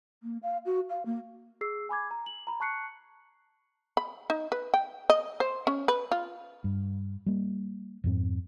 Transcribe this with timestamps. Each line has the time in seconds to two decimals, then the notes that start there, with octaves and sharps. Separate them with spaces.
0.23 A#3
0.43 F5
0.65 F#4
0.89 F5
1.06 A#3
1.61 G#4 E6 C7
1.89 G#5 B5 D6 G#6
2.11 A#5
2.26 F#7
2.47 A#5 B5
2.60 A5 C#6 F#6 C7 C#7
3.97 B5
4.30 D#4
4.52 B4
4.74 G5
5.10 D#5
5.40 C5
5.67 C#4
5.88 B4
6.11 F4
6.64 G2
7.26 G3 A#3
8.04 F2 G#2 C4